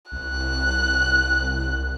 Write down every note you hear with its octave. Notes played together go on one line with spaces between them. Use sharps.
C2 F#6